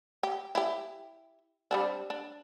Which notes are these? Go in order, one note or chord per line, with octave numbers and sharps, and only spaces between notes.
G4
E4 G4
G3 C4 D4
D4